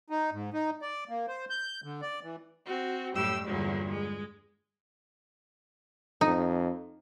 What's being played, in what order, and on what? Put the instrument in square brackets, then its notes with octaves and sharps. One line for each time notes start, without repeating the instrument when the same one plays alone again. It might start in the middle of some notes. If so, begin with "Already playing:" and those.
[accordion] D#4
G#2
D#4
D5
A#3
C5
G6
D3
D5
E3
[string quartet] C4 F#4
F#2 A2 G3 G4 E6
E2 G2 A#2 D3 F#3
G#3
[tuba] F2 [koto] D#4